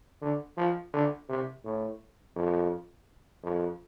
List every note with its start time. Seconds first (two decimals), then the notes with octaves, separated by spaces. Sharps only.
0.22 D3
0.57 F3
0.93 D3
1.29 C3
1.64 A2
2.36 F2
3.43 F2